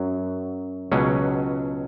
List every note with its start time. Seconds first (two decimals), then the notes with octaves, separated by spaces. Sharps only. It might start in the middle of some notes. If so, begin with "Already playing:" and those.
Already playing: F#2 F#3
0.92 C#2 B2 F#3 C#4